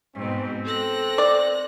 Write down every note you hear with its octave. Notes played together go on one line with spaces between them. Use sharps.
G#2 B2 C4
A4 F#6 A#6
D5